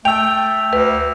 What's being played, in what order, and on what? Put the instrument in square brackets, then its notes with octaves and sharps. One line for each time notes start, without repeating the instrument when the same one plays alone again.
[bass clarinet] A3 [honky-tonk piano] G5 [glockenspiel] E6 F7
[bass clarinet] D2 [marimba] B4